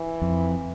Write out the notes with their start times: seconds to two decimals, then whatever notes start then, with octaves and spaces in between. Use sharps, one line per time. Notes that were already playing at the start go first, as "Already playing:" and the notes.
Already playing: E3
0.22 F2